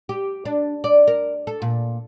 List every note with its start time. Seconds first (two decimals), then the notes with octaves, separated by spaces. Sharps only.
0.09 G4
0.45 D4
0.84 D5
1.08 A#4
1.47 A4
1.62 A#2